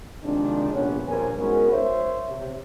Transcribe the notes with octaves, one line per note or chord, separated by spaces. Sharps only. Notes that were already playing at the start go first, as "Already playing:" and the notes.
C3 D#3 F3 G#3 C4 D4
A#1 C3 B3 C#4 C#5
A#1 G2 C#3 A#4 C5 G#5
G#3 B3 C#4 D#4 F#4 A#4
C5 C#5 E5
C3